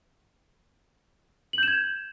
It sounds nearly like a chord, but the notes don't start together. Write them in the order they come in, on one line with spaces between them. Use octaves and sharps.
F#7 G6 E7 G#6